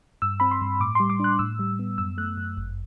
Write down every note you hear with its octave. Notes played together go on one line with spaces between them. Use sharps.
G2 E6
C4 B5
C6
G2
A2 D6
G3 C6
D6
D4 F#6
A2 E6
G3
B3
F#2 E6
A3 F#6
F#2
G1